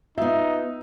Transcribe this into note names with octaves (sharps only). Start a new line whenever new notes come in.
B3 D#4 F4 E5